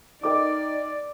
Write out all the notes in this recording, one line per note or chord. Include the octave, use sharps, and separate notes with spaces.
D#4 A#4 D5 D#5 G5 D6